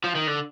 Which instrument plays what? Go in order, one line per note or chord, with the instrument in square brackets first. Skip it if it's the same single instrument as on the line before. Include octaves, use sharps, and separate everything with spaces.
[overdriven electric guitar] F3
D#3
D3